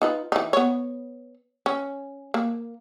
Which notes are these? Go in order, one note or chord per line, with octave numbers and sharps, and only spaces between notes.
D#4 F4 B4
E3 D#4
B3 C#5
C#4
A#3